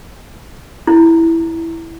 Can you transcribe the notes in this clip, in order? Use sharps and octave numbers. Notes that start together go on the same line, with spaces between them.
E4